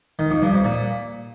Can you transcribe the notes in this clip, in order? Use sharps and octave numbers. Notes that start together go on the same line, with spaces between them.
D#3
F2
G2
F2
A#2